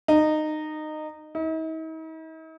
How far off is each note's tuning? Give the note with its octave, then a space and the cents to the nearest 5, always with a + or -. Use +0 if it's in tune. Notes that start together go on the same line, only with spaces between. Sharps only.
D#4 -20
D#4 +45